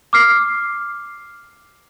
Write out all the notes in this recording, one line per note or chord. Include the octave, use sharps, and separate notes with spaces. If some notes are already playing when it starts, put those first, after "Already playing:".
D6 F6 C7